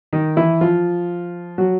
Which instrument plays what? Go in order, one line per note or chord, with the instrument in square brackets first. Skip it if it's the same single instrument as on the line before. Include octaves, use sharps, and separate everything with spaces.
[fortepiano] D#3 D#4
E3 E4
F3 F4
F#3 F#4